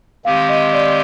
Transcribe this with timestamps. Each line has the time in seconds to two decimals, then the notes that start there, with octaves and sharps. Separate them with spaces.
0.25 D#3 G#3 C4 G4 F5
0.49 D#5
0.73 D5